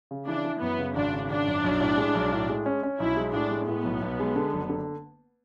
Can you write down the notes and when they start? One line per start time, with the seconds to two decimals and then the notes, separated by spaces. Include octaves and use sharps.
0.11 C#3
0.28 E3 D4
0.45 E3
0.61 F#2 B3
0.79 C#3
0.96 G#1 D4
1.13 C#3
1.30 G#1 D4
1.47 F#2
1.64 B1
1.81 A2
1.98 G#3
2.15 B1
2.33 A2
2.49 G#3
2.66 C#4
2.83 C#4
3.00 B1 E4
3.17 G#3
3.33 A2 D4
3.51 G#3
3.68 A2 B3
3.85 B1
4.02 B1
4.20 G#3
4.36 D3
4.53 F#1
4.70 D3